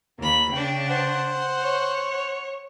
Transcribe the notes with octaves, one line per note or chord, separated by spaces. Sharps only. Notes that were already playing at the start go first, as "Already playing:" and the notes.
D#2 A#3 B5
C#3 D4 G5
C5 F#5
C#5